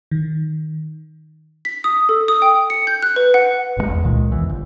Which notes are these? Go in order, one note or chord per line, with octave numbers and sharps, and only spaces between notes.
D#3
B6
D#6
A4
D#6
G5
C#7
G6
F#6
B4
F#5
G1 C#3 G#3
E2
C#2 A#2 D#3 G#3
A#1 E2 E3
G1